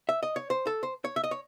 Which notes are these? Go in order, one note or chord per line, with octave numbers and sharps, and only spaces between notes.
E5
D#5
C#5
C5
A4
C5
C#5
E5
D#5
C#5